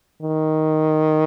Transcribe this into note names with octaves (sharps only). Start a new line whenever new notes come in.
D#3